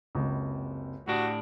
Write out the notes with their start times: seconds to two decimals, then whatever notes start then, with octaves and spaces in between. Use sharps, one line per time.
0.15 F#1 C#2 C3
1.08 A2 D4 F#4 G4 D#6